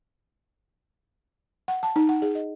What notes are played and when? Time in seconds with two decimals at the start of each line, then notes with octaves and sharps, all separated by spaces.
1.68 F#5
1.83 A5
1.96 D#4
2.09 F#5
2.22 G#4
2.35 D#5